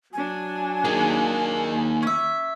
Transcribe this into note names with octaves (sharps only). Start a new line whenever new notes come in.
F#3 D4 G#5
D#3 A#3 G#4
C#4 E5